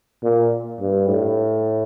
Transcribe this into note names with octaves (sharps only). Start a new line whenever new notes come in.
A#2
G2
A2